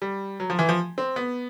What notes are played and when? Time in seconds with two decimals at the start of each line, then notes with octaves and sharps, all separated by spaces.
0.02 G3
0.40 F#3
0.50 F3
0.59 E3
0.69 F3
0.98 C4
1.16 B3